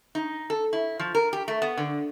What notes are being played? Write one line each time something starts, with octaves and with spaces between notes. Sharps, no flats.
D#4
A4
E4
F3
A#4
G4
A3
B3
D3